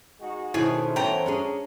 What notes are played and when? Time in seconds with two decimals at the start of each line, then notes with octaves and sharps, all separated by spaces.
0.20 G#3 D#4 F#4
0.54 B2 D#3 A3 C#4 E4 G#4 C5
0.96 E3 B3 C#4 G5 A#5
1.26 C#4 D4 G#4